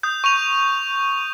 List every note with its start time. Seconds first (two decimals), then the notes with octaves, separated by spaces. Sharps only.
0.03 D#6 G6
0.24 C#6 D#7 F7